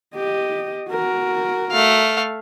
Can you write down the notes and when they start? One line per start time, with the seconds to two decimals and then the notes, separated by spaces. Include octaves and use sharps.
0.15 G4 D#5
0.89 F#4 A#4
1.72 A3 F5